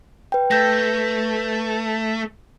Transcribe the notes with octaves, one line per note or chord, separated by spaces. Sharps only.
B4 G5
A3 B4 G6 A#6